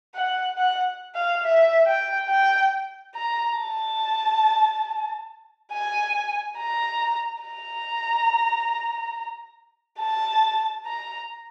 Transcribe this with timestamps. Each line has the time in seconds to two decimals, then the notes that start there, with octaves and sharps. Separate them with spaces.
0.15 F#5
0.58 F#5
1.15 F5
1.44 E5
1.87 G5
2.29 G5
3.15 A#5
3.58 A5
5.72 G#5
6.58 A#5
7.43 A#5
10.00 A5
10.86 A#5